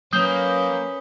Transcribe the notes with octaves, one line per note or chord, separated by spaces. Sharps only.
F#3 A#3 C#4 B4 D#6 G6 G7